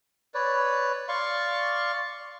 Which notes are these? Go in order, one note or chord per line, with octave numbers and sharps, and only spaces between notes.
B4 C#5 D5
D5 F5 C6 C#6